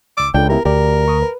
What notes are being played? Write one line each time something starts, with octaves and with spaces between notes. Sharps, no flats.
C#2 D6 E6
C#2 D4 F4 A4 G5
B3 E4 G4 A#4
D2 G4 A#4 D5
C#6 D#6
B4